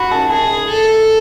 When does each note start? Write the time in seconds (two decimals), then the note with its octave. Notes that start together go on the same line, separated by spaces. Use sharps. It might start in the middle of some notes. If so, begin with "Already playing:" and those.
Already playing: F#4 B5
0.11 A5
0.30 G#4 A5
0.70 A4